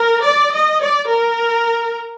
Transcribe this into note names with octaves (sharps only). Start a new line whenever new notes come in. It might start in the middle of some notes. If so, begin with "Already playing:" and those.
Already playing: A#4
D5
D#5
D5
A#4